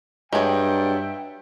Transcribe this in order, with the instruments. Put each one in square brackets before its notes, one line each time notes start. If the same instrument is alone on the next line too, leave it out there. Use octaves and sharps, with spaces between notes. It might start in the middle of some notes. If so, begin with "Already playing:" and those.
[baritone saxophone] G2 [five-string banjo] F#3 G#3 [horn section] E5 G5